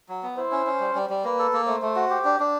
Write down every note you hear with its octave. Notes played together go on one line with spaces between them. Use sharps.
F#3
B3
E4 C5
C#4
C#4
G3
G3
G3
A#3 B4
A4
A#3
A3 C5
A3
F#4
G4
D4
D4